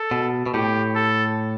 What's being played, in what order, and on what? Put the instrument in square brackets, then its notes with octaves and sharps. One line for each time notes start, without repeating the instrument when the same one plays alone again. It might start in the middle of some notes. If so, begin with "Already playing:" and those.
Already playing: [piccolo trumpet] A4
[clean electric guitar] B2
B2
[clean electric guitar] A2 [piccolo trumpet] G4
[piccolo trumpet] A4